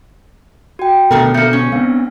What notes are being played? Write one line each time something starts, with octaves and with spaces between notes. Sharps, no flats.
F#4 G5
B2 D3 D#3 A3 A4 A#4
A3 A#3 G6 C#7
C#4
B3 C4 D4 F5